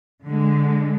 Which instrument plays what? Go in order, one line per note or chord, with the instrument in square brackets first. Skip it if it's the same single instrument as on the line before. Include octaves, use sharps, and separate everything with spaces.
[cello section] D3 G#3